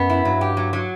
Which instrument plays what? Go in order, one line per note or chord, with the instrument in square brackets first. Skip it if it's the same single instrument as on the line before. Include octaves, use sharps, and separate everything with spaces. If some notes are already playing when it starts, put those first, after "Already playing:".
Already playing: [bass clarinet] F#2 [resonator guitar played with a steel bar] B3
[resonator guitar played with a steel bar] E4
[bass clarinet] G2 [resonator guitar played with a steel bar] F#3
[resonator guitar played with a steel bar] G4
F#3
F#3